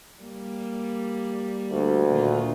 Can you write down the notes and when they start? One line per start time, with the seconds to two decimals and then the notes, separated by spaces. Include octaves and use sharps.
0.22 G3 A#3
1.71 D2
2.09 A#2 D#3 F4